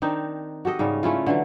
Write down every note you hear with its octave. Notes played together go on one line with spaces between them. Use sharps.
D#3 C4 D4 D#4
F#4 G4 A4 D#5
G#2 C#3 G3 C#4
A3 C#4 E4 F4
D3 E3 F#3